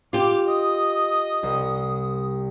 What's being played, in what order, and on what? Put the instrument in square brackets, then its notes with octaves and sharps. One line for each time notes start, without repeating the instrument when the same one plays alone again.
[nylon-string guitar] F4 G4 [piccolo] D6
[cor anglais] D#5 [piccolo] D#6
[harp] C2